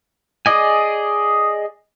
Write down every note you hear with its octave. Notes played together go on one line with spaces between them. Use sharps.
G#4 D5 D#5 G#5